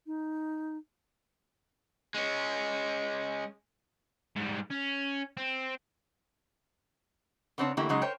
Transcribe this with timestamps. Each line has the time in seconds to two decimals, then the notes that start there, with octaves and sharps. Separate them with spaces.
0.07 D#4
2.14 G#3 C#4
4.36 G#2 G3
4.70 C#4
5.37 C4
7.58 C#3 B3 C4 D4 C#5 A5
7.77 D3 E3 A3 A#3 E4 G4
7.89 C#3 F#3 G#3 D#4
8.02 A#4 C5 C#5 G5